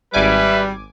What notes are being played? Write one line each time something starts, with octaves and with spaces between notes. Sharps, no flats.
G#1 G3 B4 E5 G#5 D6